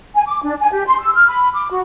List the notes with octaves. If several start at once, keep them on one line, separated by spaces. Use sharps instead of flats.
G#5
D6
D4
G#5
G4
C6
E6
F6
B5
D6
F#4